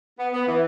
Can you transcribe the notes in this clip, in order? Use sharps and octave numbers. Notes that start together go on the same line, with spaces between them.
B3
B3
E3